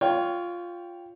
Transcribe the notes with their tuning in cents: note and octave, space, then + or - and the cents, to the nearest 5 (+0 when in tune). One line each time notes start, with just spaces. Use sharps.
F4 +0 C#5 +20 G5 +0